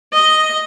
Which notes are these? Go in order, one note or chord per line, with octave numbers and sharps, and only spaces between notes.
D#5